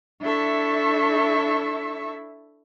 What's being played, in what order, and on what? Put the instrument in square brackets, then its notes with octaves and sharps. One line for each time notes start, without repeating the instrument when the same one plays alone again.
[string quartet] D4 E4 A4 E5 C#6